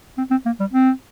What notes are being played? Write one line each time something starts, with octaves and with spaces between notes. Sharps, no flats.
C4
C4
A#3
G3
C4